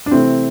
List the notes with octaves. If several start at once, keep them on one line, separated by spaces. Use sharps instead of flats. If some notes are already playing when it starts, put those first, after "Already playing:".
D4
C3 E3 A3 C4